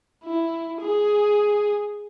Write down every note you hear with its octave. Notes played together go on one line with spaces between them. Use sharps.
E4
G#4